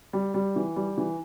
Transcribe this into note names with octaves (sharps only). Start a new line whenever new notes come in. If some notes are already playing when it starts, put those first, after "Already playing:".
G3
G3
E3
G3
E3